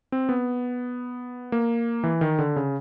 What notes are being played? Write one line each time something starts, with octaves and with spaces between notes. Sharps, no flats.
C4
B3
A#3
E3
D#3
D3
C#3